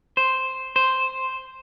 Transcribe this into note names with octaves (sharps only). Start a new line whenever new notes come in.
C5
C5